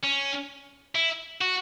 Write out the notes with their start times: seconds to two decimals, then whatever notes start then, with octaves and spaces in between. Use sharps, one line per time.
0.04 C#4
0.95 E4
1.41 F#4